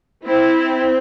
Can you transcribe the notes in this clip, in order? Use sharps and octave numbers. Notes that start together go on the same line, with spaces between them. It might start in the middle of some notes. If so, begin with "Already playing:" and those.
C4 E4